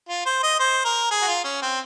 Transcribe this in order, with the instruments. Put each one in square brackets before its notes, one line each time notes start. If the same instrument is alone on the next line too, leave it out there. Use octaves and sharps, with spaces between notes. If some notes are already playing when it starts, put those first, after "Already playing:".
[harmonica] F4
C5
D#5
C5
A#4
G#4
F#4
F4
C#4
C4